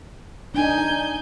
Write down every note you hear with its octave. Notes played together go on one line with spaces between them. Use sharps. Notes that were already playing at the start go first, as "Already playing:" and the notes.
D4 D#4 G#5 G6